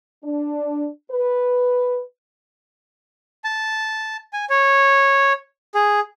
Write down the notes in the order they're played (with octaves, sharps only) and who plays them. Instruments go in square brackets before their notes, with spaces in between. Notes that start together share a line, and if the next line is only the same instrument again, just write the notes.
[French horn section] D4
B4
[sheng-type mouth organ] A5
G#5
C#5
G#4